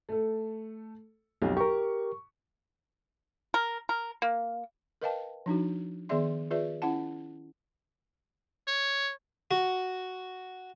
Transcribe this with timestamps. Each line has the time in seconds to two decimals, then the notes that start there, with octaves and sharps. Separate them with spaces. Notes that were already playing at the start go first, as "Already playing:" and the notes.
0.09 A3 A4
1.42 B1 F2 G4
1.57 G4 A#4 C#6
3.54 A#4
3.89 A#4
4.22 A#3
5.02 A#4 B4 D#5 F5 G5 A5
5.46 F3 D4 D#4 F#4
6.09 D#3 B3 G#4 D5 E5 C6
6.51 F4 G#4 B4 D5 E5
6.82 C#4 E4 F#5 A5
8.67 C#5
9.51 F#4